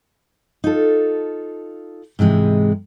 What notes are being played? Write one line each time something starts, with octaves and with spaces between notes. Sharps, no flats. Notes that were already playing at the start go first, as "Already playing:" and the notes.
D#4 F4 A4
G#2 C3 E3 G#3